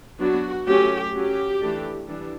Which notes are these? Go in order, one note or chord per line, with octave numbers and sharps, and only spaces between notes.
F#3 B3 D4 F#4
F#3 A3 C#4 G4
F#3 C#4 G4
E3 A3 D4
E3 G3 D4